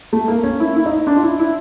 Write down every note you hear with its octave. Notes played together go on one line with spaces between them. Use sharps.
A3
A#3
C#4
E4
E4
D#4
D4
F4
E4
E4